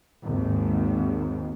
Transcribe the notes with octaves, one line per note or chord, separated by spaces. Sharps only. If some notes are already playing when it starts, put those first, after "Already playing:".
G#1 D#2 G#2